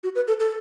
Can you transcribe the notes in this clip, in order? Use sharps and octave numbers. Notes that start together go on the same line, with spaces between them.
F#4
B4
A4
A4